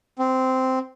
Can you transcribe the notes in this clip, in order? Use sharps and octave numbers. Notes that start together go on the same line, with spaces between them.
C4